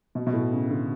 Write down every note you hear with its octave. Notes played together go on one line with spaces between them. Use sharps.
B2
B2
A2
C#3
D3